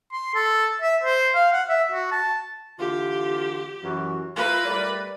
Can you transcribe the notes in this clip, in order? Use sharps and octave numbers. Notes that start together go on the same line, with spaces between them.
C6
A4
E5
C5
F5
F#5
E5
F#4
A5
D3 E3 F4 G4
F#2 E3 F#4
E4 F4 A#4 B4
G3 A3 D5